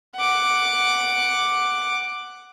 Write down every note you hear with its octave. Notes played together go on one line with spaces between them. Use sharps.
F#5 D6